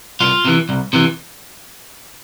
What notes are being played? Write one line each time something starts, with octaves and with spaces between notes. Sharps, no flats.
C2 F4
C3 E3
C2
C3 E3